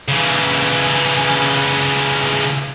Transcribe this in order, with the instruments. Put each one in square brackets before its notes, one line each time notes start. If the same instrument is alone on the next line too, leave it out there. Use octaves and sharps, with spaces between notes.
[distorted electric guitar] C#3 E3